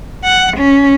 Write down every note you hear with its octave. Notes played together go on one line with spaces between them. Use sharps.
F#5
C#4